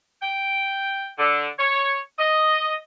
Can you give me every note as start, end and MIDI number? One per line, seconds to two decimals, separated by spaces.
0.22 1.07 79
1.18 1.47 50
1.58 1.98 73
2.18 2.75 75